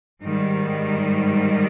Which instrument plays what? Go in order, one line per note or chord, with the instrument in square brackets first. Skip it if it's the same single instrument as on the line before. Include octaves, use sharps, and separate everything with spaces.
[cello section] G#2 D#3 G3